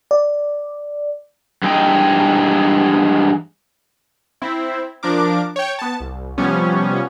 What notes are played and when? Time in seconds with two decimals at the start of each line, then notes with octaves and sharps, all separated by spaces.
0.11 D5
1.63 G2 E3 G#3 D#4 G5
4.42 C4 E4
5.03 F3 D4 A#4 D6
5.56 C#5 G5
5.79 B3 A5
6.00 C2
6.38 C3 F3 G3 B3 C#4